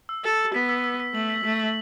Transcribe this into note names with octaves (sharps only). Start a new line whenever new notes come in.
E6
A4 E6
E6
B3 B6
E6
E6
B6
A3 F#7
B6
A3 B6
F#7